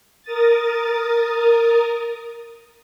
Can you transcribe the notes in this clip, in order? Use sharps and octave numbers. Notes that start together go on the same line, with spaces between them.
A#4 D#6 A6